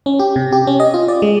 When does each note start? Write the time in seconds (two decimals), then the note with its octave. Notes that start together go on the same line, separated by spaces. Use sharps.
0.06 C#4
0.19 G4
0.36 C3
0.52 G4
0.67 C#4
0.80 D#5
0.94 F4
1.08 D5
1.22 G#3